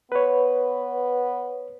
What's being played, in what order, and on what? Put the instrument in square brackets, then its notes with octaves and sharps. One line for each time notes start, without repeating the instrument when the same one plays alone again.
[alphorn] B3 [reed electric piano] B4 C#5